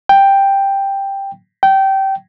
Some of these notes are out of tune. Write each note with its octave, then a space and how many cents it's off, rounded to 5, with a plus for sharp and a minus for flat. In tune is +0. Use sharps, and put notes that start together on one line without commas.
G5 +5
G5 -20